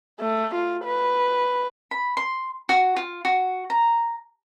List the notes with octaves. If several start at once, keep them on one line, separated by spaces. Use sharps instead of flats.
A3
F4
B4
B5
C6
F#4
F4
F#4
A#5